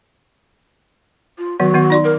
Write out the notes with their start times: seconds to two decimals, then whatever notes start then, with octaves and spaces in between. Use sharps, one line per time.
1.38 F4
1.60 D#3 F#3 B3 F#4
1.74 D#3 B3 F#5
1.90 D#4 D5 C6
2.04 A#4